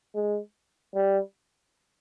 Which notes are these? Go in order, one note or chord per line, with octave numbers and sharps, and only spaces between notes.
G#3
G3